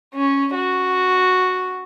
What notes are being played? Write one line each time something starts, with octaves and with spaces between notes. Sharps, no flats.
C#4
F#4